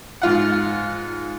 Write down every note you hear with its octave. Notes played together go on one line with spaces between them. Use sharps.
G#2 F4 F#5